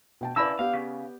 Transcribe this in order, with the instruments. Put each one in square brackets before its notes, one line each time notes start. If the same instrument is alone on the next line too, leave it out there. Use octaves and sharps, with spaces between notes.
[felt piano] B2 G5 A5
[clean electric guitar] C#3 A5 [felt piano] E4 B4 [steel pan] D5 B5 E6
[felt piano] B3 G4 [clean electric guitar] F5
[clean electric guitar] C#3